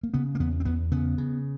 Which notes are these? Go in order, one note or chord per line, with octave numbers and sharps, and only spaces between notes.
A#3
C#3 B3
A#3
E2 B3
C4
E2 B3
C#3 B3
C#3